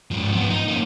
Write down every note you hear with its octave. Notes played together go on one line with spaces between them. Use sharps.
G#2 F3
F3 B3
D#4
A#3 C#4